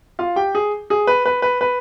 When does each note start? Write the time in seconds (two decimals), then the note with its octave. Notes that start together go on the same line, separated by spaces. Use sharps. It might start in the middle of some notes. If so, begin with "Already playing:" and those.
0.19 F4 F5
0.36 G4 G5
0.55 G#4
0.90 G#4
1.07 B4
1.26 B4
1.42 B4
1.61 B4